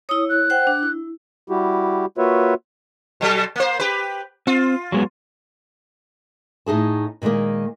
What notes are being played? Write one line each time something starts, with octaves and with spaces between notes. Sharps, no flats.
E4 C#5 D#6
F#6
C5 F#5 G5
D4
E4
G3 E4 F#4 G4
A#3 F4 F#4 B4 C#5 E5
B2 F#3 A4
A#3 C5
G4 B4
C4 F4
F#3 G#3 B3
A2 D#4 G#4 A5
A#2 D#3 E3 G#3 A#3